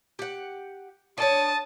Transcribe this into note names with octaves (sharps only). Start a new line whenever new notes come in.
G4 F#5
D4 C#5 A5 D#6